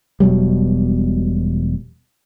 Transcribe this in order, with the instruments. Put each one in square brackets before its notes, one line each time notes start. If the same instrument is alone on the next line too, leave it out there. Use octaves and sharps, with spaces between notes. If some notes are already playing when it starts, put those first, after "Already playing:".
[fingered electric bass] E1 B2 F#3 G3